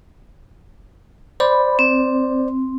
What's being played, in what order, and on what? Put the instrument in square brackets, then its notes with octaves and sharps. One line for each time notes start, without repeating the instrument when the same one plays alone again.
[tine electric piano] C5 D5 [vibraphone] B5
[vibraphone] C4